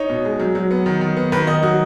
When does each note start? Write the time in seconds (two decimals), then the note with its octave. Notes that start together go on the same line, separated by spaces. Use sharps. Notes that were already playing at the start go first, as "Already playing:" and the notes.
Already playing: D#4 C#5
0.09 B2
0.25 G#3
0.40 F#3
0.55 F#3
0.71 B3
0.86 D#3
1.01 D#3
1.17 B3
1.32 D#3 B4
1.47 D#3 D#5
1.62 F#3 F#4